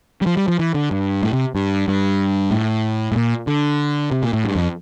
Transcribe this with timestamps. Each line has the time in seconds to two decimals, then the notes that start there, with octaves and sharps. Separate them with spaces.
0.21 G3
0.26 F3
0.37 G3
0.48 F3
0.59 E3
0.74 D3
0.91 G2
1.23 A2
1.33 C3
1.55 G2
1.88 G2
2.51 A2
3.12 A2
3.16 A#2
3.47 D3
4.12 C3
4.23 A#2
4.33 A2
4.45 G2
4.55 F2